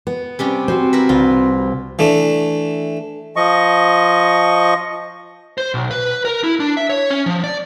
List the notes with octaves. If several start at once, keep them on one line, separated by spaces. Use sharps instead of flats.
B3
C3 G3 C#4
C4 F#4 C5
E4 A#4 B4
C2 F4
E3 A3 D4
F3 D#5 C#6
C5
B1
B4
A#4
E4
D4
E5
C#5
C#4
F3
D5